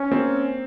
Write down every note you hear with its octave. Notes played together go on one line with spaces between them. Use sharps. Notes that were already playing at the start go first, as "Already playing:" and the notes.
Already playing: C#4
A#3 C4